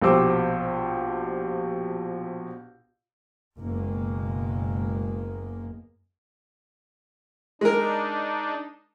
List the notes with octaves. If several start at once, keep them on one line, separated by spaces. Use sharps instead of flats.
A#1 B2 G4 C5 D6 E6
F#1 B2 G#3 A#3
G#3 D4 D#4 A#4